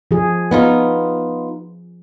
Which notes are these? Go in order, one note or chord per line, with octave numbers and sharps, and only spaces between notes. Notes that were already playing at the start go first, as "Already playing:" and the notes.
F3 G#4
B3 D#4 F4